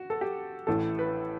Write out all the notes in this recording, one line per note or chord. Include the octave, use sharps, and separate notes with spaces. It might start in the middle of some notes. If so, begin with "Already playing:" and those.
Already playing: F#4
A4
G4
A1 A2 E3 A4
B4